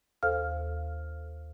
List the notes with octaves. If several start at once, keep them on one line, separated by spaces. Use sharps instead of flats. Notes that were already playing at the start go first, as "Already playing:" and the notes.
D#2 A4 C5 F5 F6